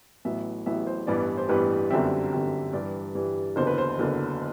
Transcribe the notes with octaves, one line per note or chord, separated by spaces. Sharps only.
A1 A2 F#3 B3 E5
A1 A2 F#3 B3 E5
C5
A1 G2 E3 G3 B3 D5
C5
A1 G2 E3 G3 B3 B4
G1 F#2 D3 G3 C4 E5
G1 F#2 D3 G3 C4
G2 E3 G3 D5
G2 E3 G3
F#1 E2 D3 F#3 C5
B4
C5
F#1 E2 D3 F#3